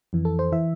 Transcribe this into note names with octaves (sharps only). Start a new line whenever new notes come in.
F2 E3
A4
C5
E3 E5